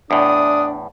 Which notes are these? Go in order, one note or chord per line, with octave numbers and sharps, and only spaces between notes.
E2 A2 D4 D#6